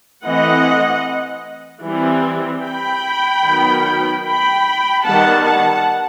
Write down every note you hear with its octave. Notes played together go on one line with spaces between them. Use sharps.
E3 A3 C4 D#5 F#5
E3 G3 C4
G5 B5
D#3 F#3 B3
G5 B5
D#3 G3 B3 F#5 A5
F#5 A5